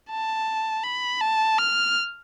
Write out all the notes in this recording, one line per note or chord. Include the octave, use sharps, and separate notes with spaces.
A5
B5
A5
F6